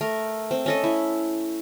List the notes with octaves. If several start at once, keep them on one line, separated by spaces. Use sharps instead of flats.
A3 A#4
C4
C#4 A4 D#5
E4